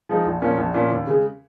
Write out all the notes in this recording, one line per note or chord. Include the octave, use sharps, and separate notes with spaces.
F3 G#3 D#4
A#1
A#2 F3 A#3 C#4
A#1
A#2 F3 A#3 C#4
D#2
C#3 G#3